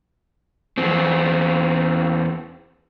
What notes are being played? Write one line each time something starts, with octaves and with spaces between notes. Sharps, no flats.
E2 C4